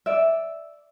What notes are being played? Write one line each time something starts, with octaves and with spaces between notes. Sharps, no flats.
D5 E5